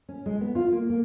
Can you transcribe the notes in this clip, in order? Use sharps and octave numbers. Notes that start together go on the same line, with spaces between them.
C#4
G#3
B3
F4
A#3
A#3